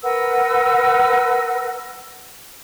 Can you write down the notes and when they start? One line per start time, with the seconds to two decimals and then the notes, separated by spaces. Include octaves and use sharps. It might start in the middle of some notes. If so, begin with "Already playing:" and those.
0.02 A#4 B4 F#5 E6